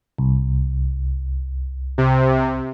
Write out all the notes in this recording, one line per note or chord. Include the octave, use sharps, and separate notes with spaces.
C2
C3